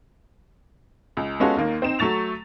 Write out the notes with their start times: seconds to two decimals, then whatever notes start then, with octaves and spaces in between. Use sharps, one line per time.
1.17 C#2
1.40 G#3 B3 C#4 F4 F#4 A4
1.57 D#2 D#3 A#3
1.82 C4 D#4 E7
1.99 F#3 A3 C#6 A6 F7